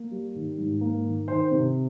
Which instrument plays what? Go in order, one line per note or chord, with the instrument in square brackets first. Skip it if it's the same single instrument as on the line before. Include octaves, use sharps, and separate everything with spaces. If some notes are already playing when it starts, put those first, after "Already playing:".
Already playing: [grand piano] A#3
G3
D#3
G#2
A#3
D#3
D#3 C5
C3